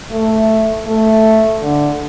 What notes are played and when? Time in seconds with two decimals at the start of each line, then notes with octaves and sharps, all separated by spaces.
0.11 A3
0.86 A3
1.62 D3